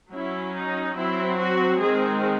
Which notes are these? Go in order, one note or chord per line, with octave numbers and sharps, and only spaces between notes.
F#3 C#4 E4
D#4
F#3 C4 E4
F#4
D#3 G#3 C4 G#4